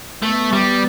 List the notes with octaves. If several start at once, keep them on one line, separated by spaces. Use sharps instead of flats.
A3 B3
G3